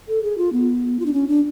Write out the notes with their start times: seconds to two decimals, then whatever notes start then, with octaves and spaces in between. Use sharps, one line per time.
0.08 A4
0.23 G#4
0.38 F4
0.53 B3
1.00 F4
1.06 D4
1.13 C#4
1.28 D4